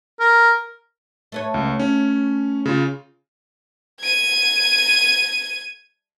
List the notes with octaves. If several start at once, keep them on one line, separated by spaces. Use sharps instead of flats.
A#4
A3 B4 C#5
C#2
C#4
C#3 F4
G#6 D#7